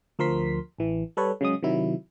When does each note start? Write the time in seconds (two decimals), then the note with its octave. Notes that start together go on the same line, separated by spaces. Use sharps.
0.19 D2 F3 A#4 C6 B6
0.79 A1 E3
1.17 G3 A4 B4 C#5
1.41 C#3 F#3 G#3 D#6
1.62 C3 D#3 F#3 E4